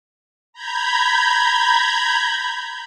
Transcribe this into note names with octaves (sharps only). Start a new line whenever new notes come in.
A#5 B5 G6 G#6